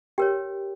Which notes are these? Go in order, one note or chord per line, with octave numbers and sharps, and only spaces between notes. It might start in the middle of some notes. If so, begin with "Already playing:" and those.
G4 A#4 C#5 G5